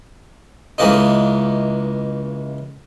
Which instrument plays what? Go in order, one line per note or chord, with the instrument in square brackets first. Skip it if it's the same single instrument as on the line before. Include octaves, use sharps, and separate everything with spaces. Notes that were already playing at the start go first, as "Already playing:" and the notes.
[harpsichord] C#2 E3 A#3 D#4